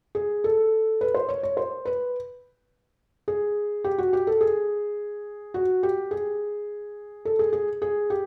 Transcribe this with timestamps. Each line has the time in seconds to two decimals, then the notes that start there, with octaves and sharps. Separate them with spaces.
0.15 G#4
0.44 A4
1.01 B4
1.14 C5
1.28 C#5
1.43 C#5
1.57 C5
1.85 B4
3.28 G#4
3.84 G4
3.98 F#4
4.13 G4
4.27 A4
4.41 G#4
5.54 F#4
5.83 G4
6.11 G#4
7.25 A4
7.39 G#4
7.53 G#4
7.82 G#4
8.10 G4